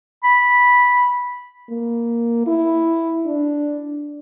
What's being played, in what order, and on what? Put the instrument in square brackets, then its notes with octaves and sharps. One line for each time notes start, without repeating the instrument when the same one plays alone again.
[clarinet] B5
[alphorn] A#3
E4
D4